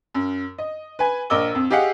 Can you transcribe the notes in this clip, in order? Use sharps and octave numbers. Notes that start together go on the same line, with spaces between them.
F#2
D#5
B4 G#5
A#1 A#4 D#5 D6 E6 G7
F2
G4 G#4 D#5 F5 F#5